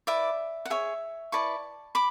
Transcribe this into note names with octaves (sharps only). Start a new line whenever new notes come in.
E4 B4 D5 E5
F#5
G#4 C#5 E5
E4 B4 D5 A5 C#6
B5 D6